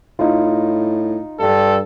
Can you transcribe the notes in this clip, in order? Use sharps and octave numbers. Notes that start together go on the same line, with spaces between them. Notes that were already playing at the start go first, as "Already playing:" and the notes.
A2 D#4 F4
G2 A4